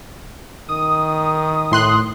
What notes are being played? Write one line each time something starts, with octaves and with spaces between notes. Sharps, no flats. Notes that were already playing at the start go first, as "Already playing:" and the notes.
D#3 D#6
A2 C6 F#6